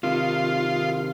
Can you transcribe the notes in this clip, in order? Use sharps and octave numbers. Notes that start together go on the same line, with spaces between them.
C3 D#3 F4